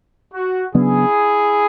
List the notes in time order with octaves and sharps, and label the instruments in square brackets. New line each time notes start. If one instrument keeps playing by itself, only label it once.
[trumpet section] F#4
[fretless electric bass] C#3 F#3 B3 D4 [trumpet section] E4 G#4